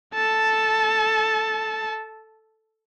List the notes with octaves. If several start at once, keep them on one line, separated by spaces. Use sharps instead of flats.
A4 A5